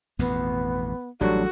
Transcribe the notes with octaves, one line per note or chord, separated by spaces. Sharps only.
A1 F2 B2 B3
A1 F#3 G3 D4 F#4 A4